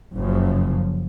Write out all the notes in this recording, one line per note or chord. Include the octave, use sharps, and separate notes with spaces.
F#1 F#2 C#3 F3